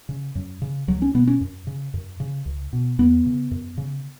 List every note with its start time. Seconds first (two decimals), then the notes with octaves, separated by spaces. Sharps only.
0.09 C#3
0.35 F#2
0.62 C#3
0.88 C#2 F#3
1.02 C#4
1.14 B2 B3
1.27 C#4
1.41 F#2
1.67 C#3
1.94 F#2
2.20 C#3
2.46 C#2
2.73 B2
2.98 E2 B3
3.26 C#3
3.51 F#2
3.78 C#3